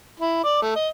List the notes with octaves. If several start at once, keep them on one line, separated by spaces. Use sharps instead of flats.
E4
D5
A3
D#5